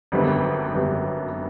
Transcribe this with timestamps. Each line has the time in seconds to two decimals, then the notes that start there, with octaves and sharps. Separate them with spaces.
0.12 G#1 F#2 D3 G3 B3
0.74 G#1 F#2 D3 G3 B3